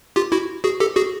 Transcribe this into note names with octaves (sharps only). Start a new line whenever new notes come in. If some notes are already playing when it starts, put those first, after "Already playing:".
F4 G4
E4 F#4
F#4 G#4
G4 A4
F#4 G#4